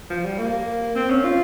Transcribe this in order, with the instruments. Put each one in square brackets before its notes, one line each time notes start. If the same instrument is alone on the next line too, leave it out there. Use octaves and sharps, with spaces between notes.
[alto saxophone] F3
G3
A#3
C4
C#4
F4